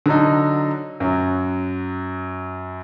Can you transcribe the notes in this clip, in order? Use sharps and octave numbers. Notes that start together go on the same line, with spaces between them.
D3 F#3 D#4
F#2 F#3